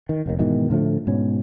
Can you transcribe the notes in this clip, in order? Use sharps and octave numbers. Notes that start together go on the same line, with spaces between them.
D#3
F1 D#2 D#3
G#2 B2 D#3 E3
A2 D3 F3 A3
G#2 B2 C#4